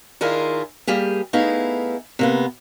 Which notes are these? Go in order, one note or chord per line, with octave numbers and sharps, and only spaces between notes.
D#3 D4 E4 F4 G#4 A#4
G3 A#3 G4 G#4
A3 B3 D#4 E4 G#4 F5
C3 A#3 B3